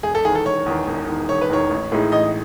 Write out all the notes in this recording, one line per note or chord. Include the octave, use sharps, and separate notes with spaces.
E1 G#4
A4
E2 D#3 G#4
A4
E1 C#5
E2 D#3
E1
E2 D#3
E1 C#5
B4
E2 D#3 C#5
A1
A2 E3 G#3 D#4
A1 D#5